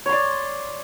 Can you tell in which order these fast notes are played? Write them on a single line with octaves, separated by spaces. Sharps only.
C#5 C6 D5